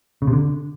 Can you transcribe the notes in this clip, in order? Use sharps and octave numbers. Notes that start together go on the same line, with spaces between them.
C#3
C3
D3